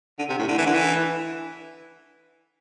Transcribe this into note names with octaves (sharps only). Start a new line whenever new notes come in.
D3
C3
A2
D3
E3
D3
E3